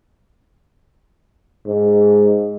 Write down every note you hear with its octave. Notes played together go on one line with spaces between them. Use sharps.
G#2